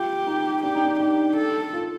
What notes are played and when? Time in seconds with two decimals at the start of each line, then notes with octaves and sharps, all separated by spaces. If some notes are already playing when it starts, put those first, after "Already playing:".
Already playing: F4 G4
0.27 D#4
0.63 D4 G4
0.75 D#4
0.85 D4
1.00 D#4 G4
1.36 A4
1.73 F4